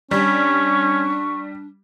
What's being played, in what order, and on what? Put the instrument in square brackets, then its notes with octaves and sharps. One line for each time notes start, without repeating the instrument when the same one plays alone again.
[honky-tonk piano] G3 [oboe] C#4 [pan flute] D4 [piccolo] C#6